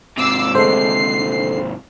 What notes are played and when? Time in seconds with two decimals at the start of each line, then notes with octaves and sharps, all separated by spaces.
0.18 G#2 C3 D6 E6 C7
0.55 D3 G#3 A3 C5 C7